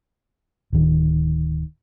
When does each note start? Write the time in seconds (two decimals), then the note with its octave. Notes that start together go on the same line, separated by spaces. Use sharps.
0.73 D1 D#3